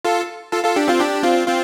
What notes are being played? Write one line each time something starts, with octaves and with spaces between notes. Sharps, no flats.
F4 A4
F4 A4
F4 A4
D4 G4
C4 F4
D4 G4
C4 F4
C4 F4